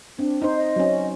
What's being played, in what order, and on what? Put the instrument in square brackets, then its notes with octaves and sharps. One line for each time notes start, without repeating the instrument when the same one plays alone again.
[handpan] C4 [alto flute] D4
[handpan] D#4 C5
[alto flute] D#5
[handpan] F#3 C#4